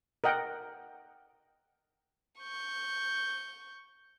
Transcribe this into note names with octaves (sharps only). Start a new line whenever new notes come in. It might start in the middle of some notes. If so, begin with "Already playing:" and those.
A#4 D#5 F#5 G5
C#6 G6